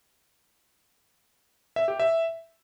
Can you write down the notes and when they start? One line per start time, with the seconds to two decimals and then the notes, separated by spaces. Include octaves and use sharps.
1.76 E5
1.88 G4
2.00 E5